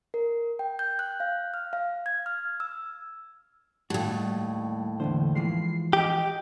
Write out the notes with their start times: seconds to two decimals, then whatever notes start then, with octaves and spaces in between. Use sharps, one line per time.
0.14 A#4
0.59 G5
0.79 G6
0.99 F#6
1.20 F5
1.54 F6
1.73 F5
2.06 G#6
2.26 F6
2.60 E6
3.90 D#2 A2 G3 F#4
5.00 E2 D3 E3 C5
5.35 E3 F3 G#3 C7
5.93 G4 D#5